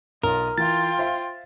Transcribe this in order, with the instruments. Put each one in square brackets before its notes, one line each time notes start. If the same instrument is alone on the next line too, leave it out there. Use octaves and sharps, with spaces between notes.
[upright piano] B1 [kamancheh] F4 D#5 [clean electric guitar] A#4
[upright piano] E3 [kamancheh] F4 G5 [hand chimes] A6
[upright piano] C5 E5 F5